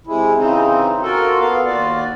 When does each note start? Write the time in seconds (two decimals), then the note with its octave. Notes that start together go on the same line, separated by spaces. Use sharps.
0.07 C3 G#3 E4
0.37 C#3 E3 C4 D#4
1.02 F4 F#4 A4 A#4
1.40 B3 F5
1.66 D#2 F4 F#4 D5